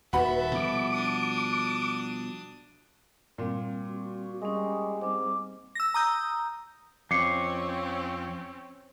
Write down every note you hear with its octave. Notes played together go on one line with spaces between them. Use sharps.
D#1 D#2 F#4 A4 B4 E5 B5
B2 F3 G3 D6
D4 D#6
A#2 G3 C4
F#4
G3 G#3 C#4 D#6
G#2 C4 D6
E6 A#6
A#5 D#6 G6
F2 C4 C#4 D6 C7 C#7